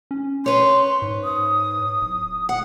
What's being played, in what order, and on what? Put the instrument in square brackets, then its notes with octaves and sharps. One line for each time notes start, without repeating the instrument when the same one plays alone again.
[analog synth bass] C#4
[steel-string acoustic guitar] B4 C#5 [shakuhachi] C6
[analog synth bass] G#2
[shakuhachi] D#6
[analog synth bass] D1
[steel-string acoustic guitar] F#5